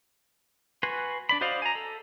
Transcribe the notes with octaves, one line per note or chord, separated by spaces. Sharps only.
F#4 B4 G#5 C6
D4 D5 B5
F#4 C5 D5 D#5 F5
G#5 A#5
A4